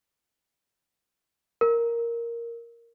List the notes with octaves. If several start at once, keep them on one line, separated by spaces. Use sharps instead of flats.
A#4